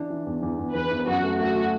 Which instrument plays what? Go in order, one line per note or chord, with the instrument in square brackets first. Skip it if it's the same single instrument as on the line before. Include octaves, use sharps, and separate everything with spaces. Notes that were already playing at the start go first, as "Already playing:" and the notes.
Already playing: [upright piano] E3 D4
E3
E2
E2
E2
[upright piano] E2 [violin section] B4
[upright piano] E2
[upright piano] F#2 [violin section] F#4
[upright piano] A3
[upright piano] A3 [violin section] F#4
[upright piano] A3